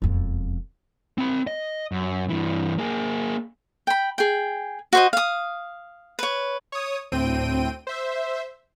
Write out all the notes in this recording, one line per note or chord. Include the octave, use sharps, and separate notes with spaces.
E1 F2
C4 B5
D#5
F#2
G2 E3
A#3 G#4
G5 B5
G#4 G5
F#4 C5 D#5
F5 D#6
B4 C#5
C#5 D#6
D2 A2 C4 G5 D#7
C5 E5